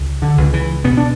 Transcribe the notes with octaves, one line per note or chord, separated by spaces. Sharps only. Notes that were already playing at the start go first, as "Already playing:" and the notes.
Already playing: C#2
D3
C#2
E3
B2 B3
D4